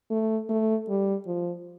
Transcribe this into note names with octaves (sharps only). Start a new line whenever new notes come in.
A3
A3
G3
F3